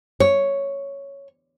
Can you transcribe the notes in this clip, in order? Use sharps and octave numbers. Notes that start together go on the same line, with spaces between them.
C#5